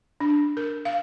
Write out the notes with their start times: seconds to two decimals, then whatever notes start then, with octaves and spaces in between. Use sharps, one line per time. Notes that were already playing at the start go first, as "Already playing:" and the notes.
0.20 D4
0.57 A#4
0.85 F5